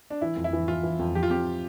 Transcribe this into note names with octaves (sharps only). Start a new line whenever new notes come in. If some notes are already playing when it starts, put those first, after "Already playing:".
D4
E3 E4
F2
E4
E3
E3 F4
E3
F2
F3 G4
F4
C4 G4